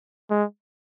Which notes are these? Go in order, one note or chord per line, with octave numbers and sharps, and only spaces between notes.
G#3